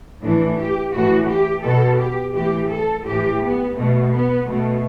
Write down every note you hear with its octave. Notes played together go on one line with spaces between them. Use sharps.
A2 E3 D4
G4
A2 E3 F#4
G4
B2 A4
G4
A2 E3 G4
A4
A2 E3 G4
B3
B2 A3
B3
B2 A3